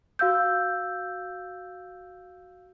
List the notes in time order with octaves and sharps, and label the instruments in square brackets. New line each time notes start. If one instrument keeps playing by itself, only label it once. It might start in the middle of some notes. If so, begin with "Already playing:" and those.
[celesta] F#4 F5 E6 G6